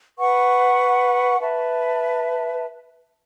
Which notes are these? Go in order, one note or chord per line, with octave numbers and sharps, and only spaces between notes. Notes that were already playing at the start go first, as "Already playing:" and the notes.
B4 F#5 C#6
B4 E5 A5